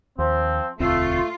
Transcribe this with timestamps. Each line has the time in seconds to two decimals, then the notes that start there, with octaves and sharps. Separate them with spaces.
0.18 D#2 F3 C4
0.80 E1 D2 A3 C4 F4